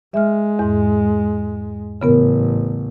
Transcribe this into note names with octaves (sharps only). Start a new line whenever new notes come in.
G#3 E5 F6
E2 G#2
A1 C#3 B3 A#4